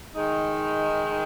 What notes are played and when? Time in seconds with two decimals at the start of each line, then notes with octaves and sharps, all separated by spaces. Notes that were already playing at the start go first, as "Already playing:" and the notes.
0.14 D#3 G#3 D#4